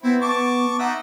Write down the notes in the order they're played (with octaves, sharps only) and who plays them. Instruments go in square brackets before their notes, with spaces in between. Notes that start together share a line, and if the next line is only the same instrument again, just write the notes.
[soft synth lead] B3 [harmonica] C4 E4
[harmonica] A5 C#6 D6
D#4 E5 F#5